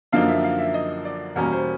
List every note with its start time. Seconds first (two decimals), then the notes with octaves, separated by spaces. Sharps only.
0.12 F#2 D3 F3 A#3 D#4 F5
0.28 E5
0.44 F5
0.58 E5
0.74 D#5
1.05 D5
1.36 E2 B2 G3 A#3 C#4 A#4
1.52 C5